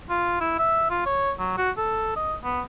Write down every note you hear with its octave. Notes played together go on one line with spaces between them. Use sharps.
F4
E4
E5
F4
C#5
F#3
F#4
A4
D#5
B3